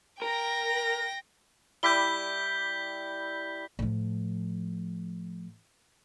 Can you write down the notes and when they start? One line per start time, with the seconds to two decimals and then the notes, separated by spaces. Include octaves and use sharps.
0.22 A#4 G5 A#6
1.83 G3 E4 D6 G6 B6 G7
3.79 A2 F3